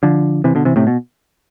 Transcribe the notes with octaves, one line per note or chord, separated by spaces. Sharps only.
D3 F3
C3 E3
B2 D3
C3 E3
A2 C3
B2